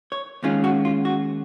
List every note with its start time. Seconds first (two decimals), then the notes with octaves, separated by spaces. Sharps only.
0.12 C#5
0.43 D#2 D#3 G#3 C#4 F4
0.64 F#4
0.85 F4
1.05 F#4